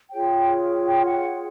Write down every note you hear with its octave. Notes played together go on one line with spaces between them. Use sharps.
F4 G#4 C#5 G5
G5
F#5